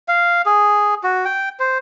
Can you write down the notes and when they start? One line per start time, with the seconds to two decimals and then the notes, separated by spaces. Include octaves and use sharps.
0.08 F5
0.46 G#4
1.04 F#4
1.25 G5
1.60 C5